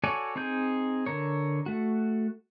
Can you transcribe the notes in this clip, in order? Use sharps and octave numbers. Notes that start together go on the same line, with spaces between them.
F#4 A4 C#5 D5 G#5
C4 D#4 G#4 G6
D3 A#4 C#5
A3 F#4